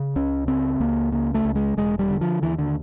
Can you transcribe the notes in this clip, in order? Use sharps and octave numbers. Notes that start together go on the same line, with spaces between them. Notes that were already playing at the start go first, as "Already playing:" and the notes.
Already playing: C#3
C#2 C#4
C#3 C4
C#2 A#3
C#3 A#3
A3
C#2
G#3
E1 G#3
G3
D3
F3
D#2 E3
D3